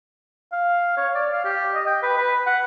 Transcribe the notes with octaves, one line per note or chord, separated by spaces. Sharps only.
F5
C#5
D5
F5
G4
D#5
G5
B4
B4
F#5